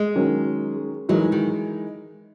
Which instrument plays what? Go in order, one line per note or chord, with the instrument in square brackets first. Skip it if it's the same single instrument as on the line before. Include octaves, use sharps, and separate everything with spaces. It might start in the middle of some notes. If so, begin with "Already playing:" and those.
Already playing: [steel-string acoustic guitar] G#3
[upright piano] D#3 F#3 C#4
[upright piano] E3 G#3 D#4 A#4 [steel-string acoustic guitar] F#3
[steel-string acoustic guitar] D#3